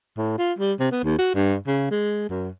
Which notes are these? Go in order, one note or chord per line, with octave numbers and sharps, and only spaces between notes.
A2
F4
G3
C3
B3
D#2
F#4
G2
C#3
G#3
F#2